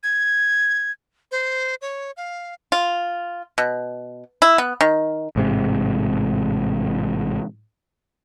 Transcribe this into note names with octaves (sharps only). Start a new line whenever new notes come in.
G#6
C5
C#5
F5
F4
B2
E4
B3
D#3
A1 G#2 C3